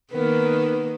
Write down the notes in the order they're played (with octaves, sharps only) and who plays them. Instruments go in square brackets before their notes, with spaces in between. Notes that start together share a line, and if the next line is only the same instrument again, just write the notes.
[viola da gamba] D#3 A#3 [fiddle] B3 [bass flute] A#4